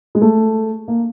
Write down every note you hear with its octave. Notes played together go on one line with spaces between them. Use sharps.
G#3
A3
A#3